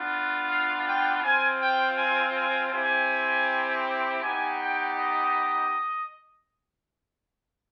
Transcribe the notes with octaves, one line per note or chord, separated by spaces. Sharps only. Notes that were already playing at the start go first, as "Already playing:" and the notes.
Already playing: B3 D4 F4
F5
G5
C4 F4 G#5
G5
G#5
G#5
C4 E4 G4 G#5
B3 D#4 G4 G#5
G5
D#5